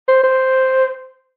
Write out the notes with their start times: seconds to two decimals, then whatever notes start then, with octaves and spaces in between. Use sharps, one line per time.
0.08 C5
0.24 C5